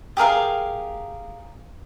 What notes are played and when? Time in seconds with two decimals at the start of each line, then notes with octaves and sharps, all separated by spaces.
0.17 G4 G#4 A#4 F5